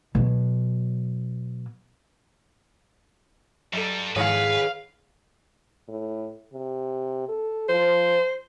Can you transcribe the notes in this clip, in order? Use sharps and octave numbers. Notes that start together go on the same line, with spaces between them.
B2 F#3
G2 F#3 G3 A4
G#2 D#3 G#4 B4 C#5 F5
A2
C3
A4
F3 C5